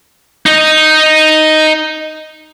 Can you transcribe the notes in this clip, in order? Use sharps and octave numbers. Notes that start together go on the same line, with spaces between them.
D#4 D#5